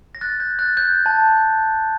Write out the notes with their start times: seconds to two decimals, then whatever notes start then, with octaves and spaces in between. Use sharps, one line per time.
0.15 A#6
0.21 F#6 A6
0.40 G6 A#6
0.59 F#6 A6
0.77 G6
1.06 A5